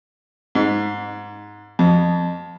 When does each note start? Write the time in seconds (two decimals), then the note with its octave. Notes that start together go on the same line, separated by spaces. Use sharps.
0.55 G#2
1.79 F2